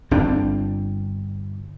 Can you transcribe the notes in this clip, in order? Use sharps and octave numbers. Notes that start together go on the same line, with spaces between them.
G1 C4 D4